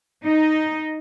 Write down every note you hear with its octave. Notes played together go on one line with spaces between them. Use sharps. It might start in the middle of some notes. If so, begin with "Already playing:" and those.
D#4